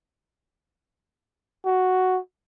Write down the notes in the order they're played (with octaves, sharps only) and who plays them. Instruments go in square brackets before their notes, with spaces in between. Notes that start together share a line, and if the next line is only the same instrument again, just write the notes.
[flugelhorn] F#4